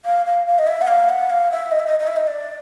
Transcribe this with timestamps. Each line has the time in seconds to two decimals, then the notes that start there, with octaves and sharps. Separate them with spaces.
0.05 F5
0.26 F5
0.47 F5
0.59 D#5
0.67 E5
0.82 F#5
0.88 F5
1.09 F#5
1.30 F5
1.51 E5
1.72 D#5
1.80 E5
1.87 D#5
2.00 D#5
2.07 E5
2.16 D#5
2.27 D5